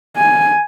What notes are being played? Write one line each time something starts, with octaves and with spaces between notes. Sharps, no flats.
G#5